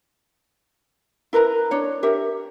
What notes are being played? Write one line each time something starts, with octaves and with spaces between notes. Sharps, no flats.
E4 A#4 B4 A#5
D4 C#5
G4 A#4 E5